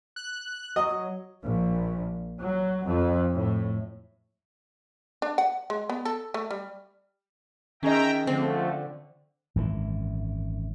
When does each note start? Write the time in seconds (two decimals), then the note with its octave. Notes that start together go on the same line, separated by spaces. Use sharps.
0.16 F#6
0.76 F#3 D#5
1.43 A#1
2.39 F#3
2.85 F2
3.34 A2
5.22 D4
5.38 F#5
5.70 G#3
5.90 B3
6.05 A4
6.34 A3
6.51 G3
7.83 D#3 C#4 G#4 D#5 E5 G5 A#5
8.27 D3 F3 A3 C4
9.56 G#1 F#2 A2 E3